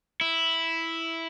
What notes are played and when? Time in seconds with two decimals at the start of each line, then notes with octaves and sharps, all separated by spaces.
0.21 E4